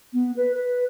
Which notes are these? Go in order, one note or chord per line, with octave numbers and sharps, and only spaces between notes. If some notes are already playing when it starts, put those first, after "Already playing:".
B3
B4
B4